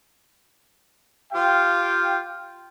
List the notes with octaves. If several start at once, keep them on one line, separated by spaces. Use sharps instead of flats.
F4 G4 F5 G5